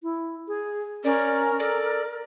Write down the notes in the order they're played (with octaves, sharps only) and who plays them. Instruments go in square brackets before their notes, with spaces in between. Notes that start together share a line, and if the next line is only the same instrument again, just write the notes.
[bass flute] E4
G#4
[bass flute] C#4 [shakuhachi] A#4 [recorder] D5
[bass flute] A4 [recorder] D5